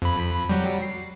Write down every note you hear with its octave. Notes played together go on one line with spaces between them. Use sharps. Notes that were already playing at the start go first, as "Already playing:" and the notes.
F2 B5
F#3 G3
C7